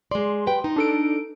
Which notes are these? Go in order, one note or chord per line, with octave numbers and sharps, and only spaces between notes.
G#3 D5 C6
G4 B4 G5
D#4
D4 A4 D7